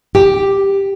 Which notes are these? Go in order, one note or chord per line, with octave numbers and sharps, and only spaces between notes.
G4